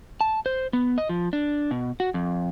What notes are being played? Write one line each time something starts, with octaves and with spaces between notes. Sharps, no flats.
A5
C5
B3
D#5
F3
D4
B2
F#4
F2